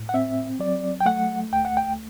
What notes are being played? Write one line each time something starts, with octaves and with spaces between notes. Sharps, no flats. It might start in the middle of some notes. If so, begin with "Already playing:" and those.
Already playing: A2
F#5
C4 E5
F#3 D5
G5
A3 F#5
D2 G5
F#5
G5